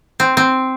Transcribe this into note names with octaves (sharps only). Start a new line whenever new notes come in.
C4
C4